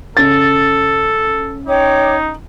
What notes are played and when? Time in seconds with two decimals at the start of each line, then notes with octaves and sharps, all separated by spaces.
0.17 C#3 A4 A6
1.67 D#4 C#5 G5 D6